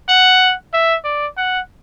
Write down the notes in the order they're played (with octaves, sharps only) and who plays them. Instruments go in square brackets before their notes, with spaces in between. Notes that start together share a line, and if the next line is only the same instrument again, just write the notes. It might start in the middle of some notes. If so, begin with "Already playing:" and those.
[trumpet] F#5
E5
D5
F#5